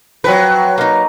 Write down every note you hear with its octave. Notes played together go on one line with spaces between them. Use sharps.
F3 F#3 C4 F#4 B4
A#3 C4 D#4